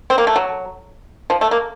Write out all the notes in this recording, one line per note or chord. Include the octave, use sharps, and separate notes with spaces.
C4
A#3
A3
F#3
F3
A3
A#3